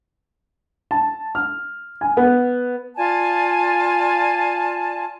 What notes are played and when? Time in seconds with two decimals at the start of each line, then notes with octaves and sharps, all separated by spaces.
0.91 A5
1.35 F6
2.01 G#5
2.17 B3
2.96 F4 D5 G#5 A5